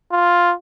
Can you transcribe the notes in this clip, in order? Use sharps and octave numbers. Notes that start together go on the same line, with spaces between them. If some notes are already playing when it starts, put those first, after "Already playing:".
F4